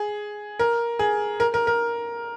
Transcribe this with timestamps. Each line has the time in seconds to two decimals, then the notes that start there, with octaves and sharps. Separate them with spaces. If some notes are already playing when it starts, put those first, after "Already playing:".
Already playing: G#4
0.59 A#4
0.99 G#4
1.40 A#4
1.54 A#4
1.67 A#4